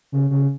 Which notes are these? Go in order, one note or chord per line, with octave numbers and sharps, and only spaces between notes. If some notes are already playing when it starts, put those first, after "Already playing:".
C#3
C#3